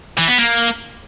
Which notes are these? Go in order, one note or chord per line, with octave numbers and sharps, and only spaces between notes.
E3
B3
A#3